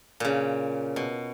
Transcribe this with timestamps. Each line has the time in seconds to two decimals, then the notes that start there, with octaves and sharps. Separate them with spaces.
0.20 A#2 C#3
0.96 B2